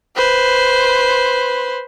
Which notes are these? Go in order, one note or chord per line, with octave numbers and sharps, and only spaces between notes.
B4 C5